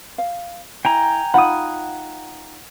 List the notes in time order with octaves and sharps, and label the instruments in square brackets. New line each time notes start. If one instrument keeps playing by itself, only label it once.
[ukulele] F5
[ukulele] E4 [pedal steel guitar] G5 G#5 A#5
[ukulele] D#4 F4 B5 [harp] F#5 D#6